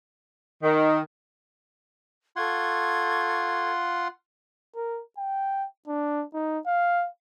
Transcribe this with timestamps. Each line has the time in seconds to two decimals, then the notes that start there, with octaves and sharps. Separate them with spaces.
0.63 D#3
2.36 F4 A4 F#5 C6 C#6 G#6
4.75 A#4
5.18 G5
5.87 D4
6.34 D#4
6.66 F5